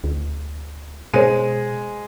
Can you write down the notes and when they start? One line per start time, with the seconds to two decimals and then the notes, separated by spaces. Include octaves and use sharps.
0.04 D2
1.14 B2 G#3 C5 D#7